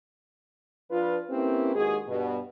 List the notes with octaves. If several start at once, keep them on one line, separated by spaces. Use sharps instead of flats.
F3 D4 F4 B4
A#3 C4 C#4 E4 G4 B4
D#2 G#3 F#4 G#4
G2 B2